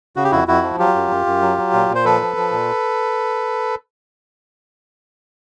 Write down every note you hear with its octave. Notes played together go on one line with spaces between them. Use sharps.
C#3 F#4
G4
F2 E4 F#4
F2 E4 F#4
F3
F#3 F4 G4
F#2
F#2
F#2
F#3
F#3
A#2
A#2
C5
F3 A4 B4
F3
F3
A#2